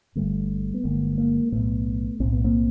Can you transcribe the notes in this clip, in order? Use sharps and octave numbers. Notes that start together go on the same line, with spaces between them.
G1 G2 D3 G3 A3
B3
G1 G2 D3 G#3 A#3
G#3 A#3
B1 A2 A3 B3
B1 A2 C4
B3
A#3 C4